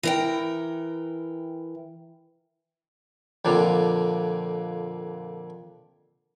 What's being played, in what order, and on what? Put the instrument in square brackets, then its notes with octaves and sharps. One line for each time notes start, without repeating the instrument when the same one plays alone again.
[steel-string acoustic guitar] E3 A#4 G5
[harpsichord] F2 A#2 D3